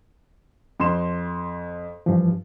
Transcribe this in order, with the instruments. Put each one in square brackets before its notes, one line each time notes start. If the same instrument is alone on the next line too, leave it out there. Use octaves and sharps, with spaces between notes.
[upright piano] F2 C6 E7
[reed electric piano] G2 E3 F3